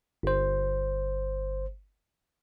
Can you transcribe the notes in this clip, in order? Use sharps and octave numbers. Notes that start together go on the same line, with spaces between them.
G1 C5